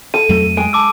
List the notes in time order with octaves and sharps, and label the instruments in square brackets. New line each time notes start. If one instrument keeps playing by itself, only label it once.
[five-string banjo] A4 [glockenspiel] D#7
[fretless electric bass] F2 F#3 A3
[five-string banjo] G#3 [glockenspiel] D7
[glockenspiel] A5 D6 E6